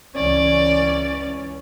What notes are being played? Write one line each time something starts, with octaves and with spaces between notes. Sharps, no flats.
C#2 E3 C#4 D5